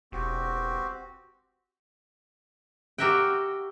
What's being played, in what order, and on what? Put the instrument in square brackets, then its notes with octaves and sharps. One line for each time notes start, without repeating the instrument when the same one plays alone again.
[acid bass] E1 [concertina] C4 F#4 G4
[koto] F#4 G4 A#4 E5 F#5 G5